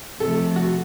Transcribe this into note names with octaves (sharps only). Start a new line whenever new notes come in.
C3 F3 A3 A4
F#4